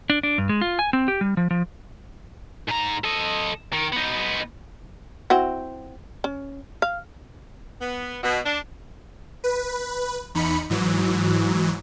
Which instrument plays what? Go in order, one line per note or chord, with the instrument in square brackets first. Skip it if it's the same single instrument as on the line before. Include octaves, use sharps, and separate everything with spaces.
[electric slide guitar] D4
D4
G2
G#3
F4
G#5
C4
G4
G3
F3
F3
[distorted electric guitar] G#2 A#5
A4 D#5
D#3
B3 D#4
[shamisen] C4 E4 F#4
C#4
F5
[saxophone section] B3
B2
D4
[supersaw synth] B4
E2 D#4 B5 C#7
G#2 E3 F#3